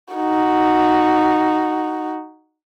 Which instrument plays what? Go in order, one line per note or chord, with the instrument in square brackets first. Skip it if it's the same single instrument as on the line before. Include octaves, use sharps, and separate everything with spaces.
[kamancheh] D#4 F#4